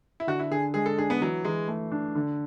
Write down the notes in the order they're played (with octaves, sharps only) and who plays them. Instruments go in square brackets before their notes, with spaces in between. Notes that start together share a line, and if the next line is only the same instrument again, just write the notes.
[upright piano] E4
[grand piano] D3 [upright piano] F#4
[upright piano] E4
[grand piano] D3 [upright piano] G#4
[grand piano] G#3 [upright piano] G#4
[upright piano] A4
[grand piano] D4 [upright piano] G#4
[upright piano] B3
[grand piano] E3 [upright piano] F#3
[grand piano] E3 [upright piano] G#3
[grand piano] A3
D4
D3